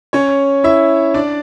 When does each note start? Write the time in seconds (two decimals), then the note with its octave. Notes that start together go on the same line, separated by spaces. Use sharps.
0.13 C#4 C#5
0.64 E4 E5
1.14 D4 D5